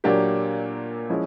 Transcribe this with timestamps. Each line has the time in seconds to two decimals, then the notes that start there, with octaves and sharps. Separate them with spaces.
0.04 A#2 F#3 A#3 D4 G4
1.09 F3 G#3 C#4 E4